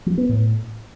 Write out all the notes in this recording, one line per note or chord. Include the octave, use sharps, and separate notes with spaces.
F3
B3
A2